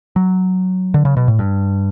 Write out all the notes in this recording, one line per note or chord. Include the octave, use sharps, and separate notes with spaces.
F#3
D3
C#3
B2
A2
G2